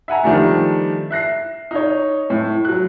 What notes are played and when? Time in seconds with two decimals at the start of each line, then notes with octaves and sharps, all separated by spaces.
0.08 E5 F#5 G#5 A#5
0.23 D#3 F3 G3 A3 D4
1.10 E5 F#6 A#6 C7
1.71 D#4 C#5
2.30 A2
2.65 F#3 F#6